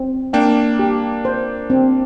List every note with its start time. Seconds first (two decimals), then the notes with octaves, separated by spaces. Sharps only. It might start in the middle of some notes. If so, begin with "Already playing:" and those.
Already playing: C4
0.33 A#3 D4 G5
0.79 G4
1.25 C5
1.70 C4